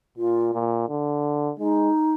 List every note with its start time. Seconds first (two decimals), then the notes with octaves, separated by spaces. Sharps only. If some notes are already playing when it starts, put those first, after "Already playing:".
0.17 A#2 F4
0.53 A#2
0.89 D3
1.59 G#3 D#4